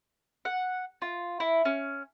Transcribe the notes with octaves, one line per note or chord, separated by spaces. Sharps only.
F#5
F4
E4
C#4